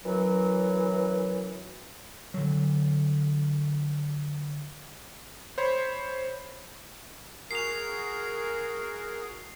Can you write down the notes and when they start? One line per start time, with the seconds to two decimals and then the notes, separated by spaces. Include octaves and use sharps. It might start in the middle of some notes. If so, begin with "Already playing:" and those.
0.04 F#2 E3 F#3
2.34 D3 F#3
5.58 C5 C#5 B5 C6
7.51 F#4 G#4 A#4 C7 F7